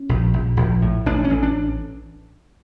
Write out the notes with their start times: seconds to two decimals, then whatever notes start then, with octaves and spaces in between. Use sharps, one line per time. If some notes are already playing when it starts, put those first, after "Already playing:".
Already playing: C#4
0.09 A#1
0.34 A#1
0.57 A#1
0.82 A2
1.06 A1 D4
1.24 C#4
1.30 A1
1.43 D4